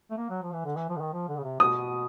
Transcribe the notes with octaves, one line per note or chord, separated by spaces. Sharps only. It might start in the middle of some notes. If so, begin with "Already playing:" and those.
A3
A#3
F#3
F3
E3
D3
E3
F3
D3
D#3
F3
D3
C#3
C3
B2 D#6